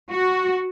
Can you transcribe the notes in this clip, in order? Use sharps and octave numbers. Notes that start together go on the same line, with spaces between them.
F#4